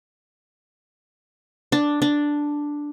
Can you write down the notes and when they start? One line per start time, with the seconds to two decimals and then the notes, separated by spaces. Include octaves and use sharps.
1.72 D4
2.02 D4